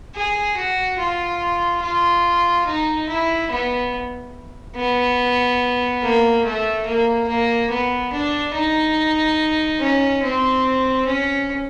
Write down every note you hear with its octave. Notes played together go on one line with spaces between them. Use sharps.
G#4
F#4
F4
F4
D#4
E4
B3
B3
A#3
A3
A#3
A#3
B3
D4
D#4
C#4
C4
C#4